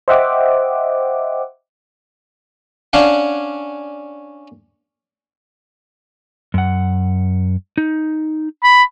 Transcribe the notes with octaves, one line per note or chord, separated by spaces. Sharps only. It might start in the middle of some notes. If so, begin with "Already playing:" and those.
C5 D#5 E5 F#5 G5 D6
C#4 D4 F5 F#5
F#2 F#5
D#4
B5